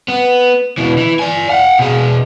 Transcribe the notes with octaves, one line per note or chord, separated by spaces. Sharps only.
B3
B2 E3
E3
D5 G#5
F5 F#5
B2 G#4